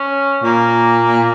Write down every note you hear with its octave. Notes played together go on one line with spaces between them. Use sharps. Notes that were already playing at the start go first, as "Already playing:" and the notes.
Already playing: C#4
A#2 A#3